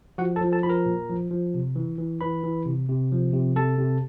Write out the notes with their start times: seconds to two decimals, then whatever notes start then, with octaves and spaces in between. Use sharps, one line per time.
0.18 F3 F#4 F#5
0.36 A4 A5
0.41 F3
0.52 A4 A5
0.63 F3 B5
0.69 A#4 A#5
0.86 A#2
1.09 F3
1.31 F3
1.54 C3
1.76 E3
1.98 E3
2.21 E3 B4 B5
2.44 E3
2.66 C3
2.89 C3
3.12 F3
3.33 C3
3.56 C3 A4 A5
3.78 C3